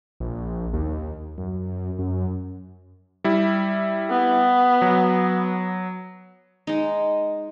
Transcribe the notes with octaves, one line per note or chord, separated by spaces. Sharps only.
A#1
D#2
F#2
F#2
G3 E4
B3
F#3
G#3 D#4